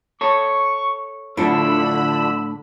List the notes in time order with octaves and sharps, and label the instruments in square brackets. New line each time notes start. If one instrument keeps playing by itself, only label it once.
[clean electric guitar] A4 C#5 [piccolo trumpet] C#6
[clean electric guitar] A2 D4 A4 [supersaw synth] D3 B5 [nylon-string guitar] F3 E4 [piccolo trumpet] E6